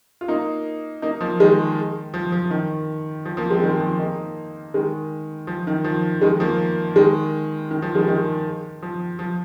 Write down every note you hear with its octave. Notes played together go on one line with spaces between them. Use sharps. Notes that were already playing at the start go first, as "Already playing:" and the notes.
F4
A#3 D#4
A#3 D#4
F3 A#3
D#3 G#3
F3
F3
D#3
F3
F3 A#3
G#3 C4
D#3 G#3
F3
A#3 D#4
D#3 G#3
F3
D#3
F3
D#3 G#3
F3 A#3
D#3 G#3
D#3
F3
D#3 G#3
D#3 G#3
F3
F3